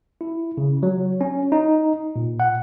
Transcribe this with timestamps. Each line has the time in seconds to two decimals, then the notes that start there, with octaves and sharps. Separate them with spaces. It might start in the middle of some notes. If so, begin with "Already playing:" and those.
0.21 E4
0.58 C#3
0.83 F#3
1.21 C#4
1.52 D#4
2.16 A#2
2.40 F#5